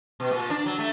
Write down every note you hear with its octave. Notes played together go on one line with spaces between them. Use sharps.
B2
A#2
D4
F#3
A3